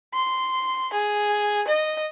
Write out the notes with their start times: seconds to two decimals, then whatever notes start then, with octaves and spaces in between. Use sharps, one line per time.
0.14 C6
0.93 G#4
1.67 D#5